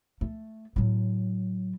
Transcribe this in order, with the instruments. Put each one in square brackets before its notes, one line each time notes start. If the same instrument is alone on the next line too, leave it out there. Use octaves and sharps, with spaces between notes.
[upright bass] A3
A2 F#3